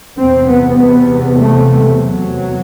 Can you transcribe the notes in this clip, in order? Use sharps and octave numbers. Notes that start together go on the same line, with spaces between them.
E2 C3 C4
B3
B3
A3
F#3